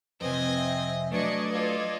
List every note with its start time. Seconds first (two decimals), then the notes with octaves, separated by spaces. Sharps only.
0.21 F2 C3 C4 B4 D#5 G#5
0.56 E5
1.12 F#3 A3 D4 B4 D5 D#5 C#6 G#6
1.51 F4 A4